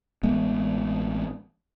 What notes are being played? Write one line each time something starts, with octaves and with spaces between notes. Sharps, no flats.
A1 G#3 B3